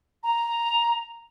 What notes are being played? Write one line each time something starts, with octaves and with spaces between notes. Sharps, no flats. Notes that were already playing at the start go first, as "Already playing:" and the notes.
A#5